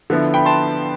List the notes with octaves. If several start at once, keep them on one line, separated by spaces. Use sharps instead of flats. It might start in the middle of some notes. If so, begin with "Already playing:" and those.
D3 F3 B3 E4
G5 B5
A5 C6